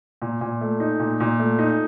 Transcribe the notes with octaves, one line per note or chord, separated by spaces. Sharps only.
A#2
A#2
A3
D#4
A#2
A#2
A3
D#4